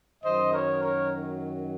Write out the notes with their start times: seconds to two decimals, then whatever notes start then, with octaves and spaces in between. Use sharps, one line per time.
0.23 F#2 D#3 F#3 C5 D#5
0.53 A#4 C#5
0.83 A#4 C#5